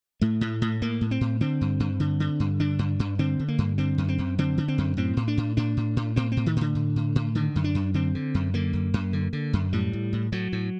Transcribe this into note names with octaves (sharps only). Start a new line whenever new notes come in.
A2 A3
A2
A2
A2 A#3
A2
C4
A2
D3 C4
G2
G2
D3
D3
G2
D3 D4
G2
G2
D3 C4
D3
A#3
G2
D3 C4
F#2
C4
F#2
D3 C4
D3
C4
F#2
A2 C4
A2
D4
A2
A2 D4
A2
A2
A2 C4
C4
A2
D#3
A2 D3
A2
A2
A2
D3 D#3
F#2
D4
F#2
D3 C4
D3
F#2
D3 A#3
F#2
F#2
D3
D3
F#2
A2 G3
A2
A2
A2 F#3
A2